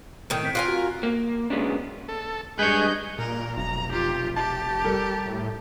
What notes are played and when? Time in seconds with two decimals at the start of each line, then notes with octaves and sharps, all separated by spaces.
0.30 A2 D#3
0.43 C4 B6 D7
0.55 F4 A#4 G#5 F#6
0.68 F#4
1.03 A#3
1.50 D3 F#3 G#3 B3 C#4 D4
2.08 A4
2.59 G2 G#3 G#4 B4 C#5 D#5 G6
3.18 A#2 A#4
3.57 F1 B1 A#5
3.92 F4 G4
4.37 G4 A5
4.84 G3 A4 A#4
5.26 A2